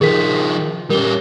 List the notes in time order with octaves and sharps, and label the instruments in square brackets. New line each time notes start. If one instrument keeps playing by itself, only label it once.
[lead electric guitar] D#3 F3 [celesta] G#4 A#4 B6
[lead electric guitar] G3 C#4 [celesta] A#4 G7